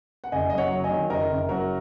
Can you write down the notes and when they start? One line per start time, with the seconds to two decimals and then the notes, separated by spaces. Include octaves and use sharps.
0.24 F#5
0.32 F#1 D#5 G#5
0.50 F#3 D#5
0.58 C#5 F#5
0.71 F#3
0.84 D#5 G#5
0.91 D#3
1.10 F#1 A#4 D#5
1.30 F#1
1.49 F#3 F#4 A#4